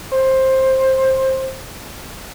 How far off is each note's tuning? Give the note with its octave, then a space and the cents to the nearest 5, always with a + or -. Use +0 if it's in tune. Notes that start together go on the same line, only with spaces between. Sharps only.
C5 +15